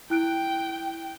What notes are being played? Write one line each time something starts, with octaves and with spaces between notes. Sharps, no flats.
E4 G5 F#6 D7